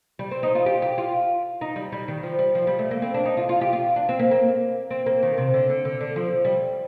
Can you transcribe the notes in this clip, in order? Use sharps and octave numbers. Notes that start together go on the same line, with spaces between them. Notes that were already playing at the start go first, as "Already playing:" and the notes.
G3
C4
D#4
F4
G4
G4
F4
D#4
G3
G3
D#3
F3
G3
F3
G3
A3
A#3
C4
D4
D#4
F4
F4
G4
F4
D4
C4
A#3
A#3
C4
A#3
D#3
C3
D3
D3
D3
D3
F3
G3